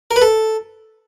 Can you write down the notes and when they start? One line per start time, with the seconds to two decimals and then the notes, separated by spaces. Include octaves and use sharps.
0.11 A#4
0.16 B4
0.22 A4